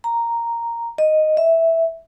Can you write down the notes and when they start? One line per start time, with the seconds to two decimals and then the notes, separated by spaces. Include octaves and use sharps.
0.04 A#5
0.98 D#5
1.37 E5